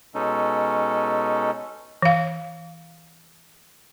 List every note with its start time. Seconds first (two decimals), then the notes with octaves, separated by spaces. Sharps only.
0.15 B2 G#3 C#4 D#4 A4
2.02 E3 F5